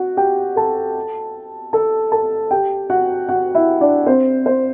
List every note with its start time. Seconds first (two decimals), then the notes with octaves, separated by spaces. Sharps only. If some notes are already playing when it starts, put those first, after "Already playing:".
Already playing: F#4 F#5
0.17 G4 G5
0.56 A4 A5
1.73 A4 A5
2.12 A4 A5
2.51 G4 G5
2.90 F#4 F#5
3.29 F#4 F#5
3.55 E4 E5
3.81 D4 D5
4.07 C4 C5
4.46 C4 C5